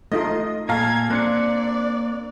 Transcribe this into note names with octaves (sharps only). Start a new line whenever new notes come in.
A3 D#4 F4 D#5
A#2 A4 F5 A#5 G#6
A#3 C4 D4 D5 F#6 C#7